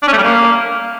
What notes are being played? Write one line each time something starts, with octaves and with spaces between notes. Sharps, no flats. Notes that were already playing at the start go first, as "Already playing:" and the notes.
D4
C#4
A3
G3
A#3